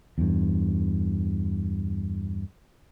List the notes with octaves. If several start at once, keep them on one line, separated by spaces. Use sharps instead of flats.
E2 G2